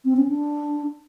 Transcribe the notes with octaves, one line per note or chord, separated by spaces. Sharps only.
C4
C#4
D4